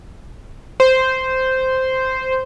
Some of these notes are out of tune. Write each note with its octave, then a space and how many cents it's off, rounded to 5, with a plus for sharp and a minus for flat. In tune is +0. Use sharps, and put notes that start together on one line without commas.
C5 -5